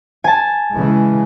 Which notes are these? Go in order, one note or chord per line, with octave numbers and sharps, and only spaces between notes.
G#5 A5
C#3 E3 G#3